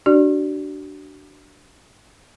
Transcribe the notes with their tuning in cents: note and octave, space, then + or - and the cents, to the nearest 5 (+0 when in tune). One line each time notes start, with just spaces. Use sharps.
D4 +0 F#4 +35 D5 +0